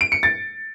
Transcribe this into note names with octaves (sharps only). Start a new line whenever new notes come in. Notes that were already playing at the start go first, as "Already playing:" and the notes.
D7
C#7
A6